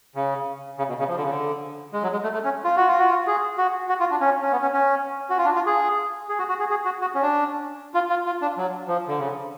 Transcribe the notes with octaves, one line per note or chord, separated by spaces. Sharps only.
C#3
C#3
B2
C#3
F3
D3
C#3
D3
G#3
F#3
G#3
A3
A3
C#4
F4
F#4
F4
F#4
F4
G#4
F#4
F#4
F4
D4
C#4
C#4
B3
C#4
C#4
F#4
F4
D4
F4
G#4
G#4
F#4
F#4
G#4
G#4
F#4
F#4
C#4
D4
F4
F4
F4
D4
F#3
F3
D3
C#3